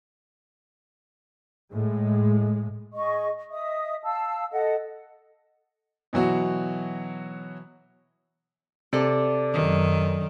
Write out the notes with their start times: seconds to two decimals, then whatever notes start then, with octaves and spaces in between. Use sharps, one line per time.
1.72 A2 G#3
2.94 G#4 D#5 C#6
3.51 D#5 E5 D#6
4.04 F5 A5 E6
4.51 A4 D#5 F#5
6.13 B2 E3 F#3 F#4
8.93 C3 A4 D5
9.54 F#2 D#3